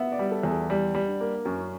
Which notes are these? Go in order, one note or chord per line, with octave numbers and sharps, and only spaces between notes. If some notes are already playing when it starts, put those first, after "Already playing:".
Already playing: B3 E5 F#5
D5
G3
A4
E2
G#4
G3
G3
D4
A#3
F#2 C#4